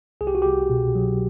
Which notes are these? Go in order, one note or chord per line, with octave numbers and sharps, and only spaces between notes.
C2 G#4
G4
F#4
C2 G4
B2
F#3